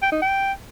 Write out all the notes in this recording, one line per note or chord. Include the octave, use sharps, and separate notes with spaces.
G5
D#4
G5